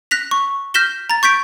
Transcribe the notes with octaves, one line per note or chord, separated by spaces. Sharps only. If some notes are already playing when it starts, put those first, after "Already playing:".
F#6 A#6 B6 F7
C#6
F6 G6 A#6 B6 E7 G7
A#5 A6
C#6 G6 B6 D7